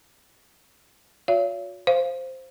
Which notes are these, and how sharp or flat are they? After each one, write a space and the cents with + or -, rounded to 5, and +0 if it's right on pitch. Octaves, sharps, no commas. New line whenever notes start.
F#4 -45 C#5 +40 F5 -40
C5 +0 F5 -10